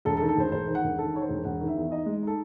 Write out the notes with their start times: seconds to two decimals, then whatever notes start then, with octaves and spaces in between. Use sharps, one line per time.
0.05 E1 A4
0.17 A4
0.21 D#3
0.29 A4
0.37 E1 C5
0.52 E1 C5
0.67 D#3
0.75 F#5
0.83 E1
0.98 D#3 A4
1.14 D#3 C#5
1.22 C5
1.29 E1
1.44 E1 F#5
1.61 D#3
1.68 E5
1.76 E2
1.91 D#4 D#5
2.06 G#3
2.22 D#4 A4